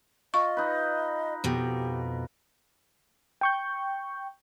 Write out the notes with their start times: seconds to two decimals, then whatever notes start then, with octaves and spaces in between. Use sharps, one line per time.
0.34 F4 D#5 C#6
0.57 D#4 B4
1.44 F2 B2 G4
3.41 G5 C#6 G6